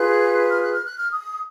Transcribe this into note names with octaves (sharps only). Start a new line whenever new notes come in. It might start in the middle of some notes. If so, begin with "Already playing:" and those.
Already playing: F4 G#4 B4 F#6
F6
F#6
F6
F#6
F6
D#6